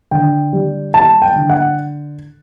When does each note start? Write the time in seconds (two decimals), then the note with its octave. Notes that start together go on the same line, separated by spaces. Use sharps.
0.11 D3 G5
0.53 G3
0.94 G3 A5
1.22 G5
1.36 D3
1.50 F#5